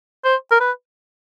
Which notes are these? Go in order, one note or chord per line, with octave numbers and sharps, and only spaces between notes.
C5
A#4
B4